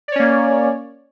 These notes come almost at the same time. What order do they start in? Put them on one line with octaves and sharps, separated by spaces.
D5 C#5 C#4 A#3